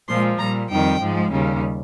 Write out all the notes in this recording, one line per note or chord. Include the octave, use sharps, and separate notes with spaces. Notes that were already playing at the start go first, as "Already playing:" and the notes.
A#2 F3 G#3 C6
A#2 G3 A#5
F2 D#3 G3 G5
G#2 F3 G#3
D#2 C#3 G3